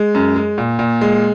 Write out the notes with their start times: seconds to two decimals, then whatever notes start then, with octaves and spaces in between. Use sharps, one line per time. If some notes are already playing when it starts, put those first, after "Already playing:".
Already playing: G#3
0.14 F#2
0.36 G#3
0.58 A#2
0.79 A#2
1.01 G#3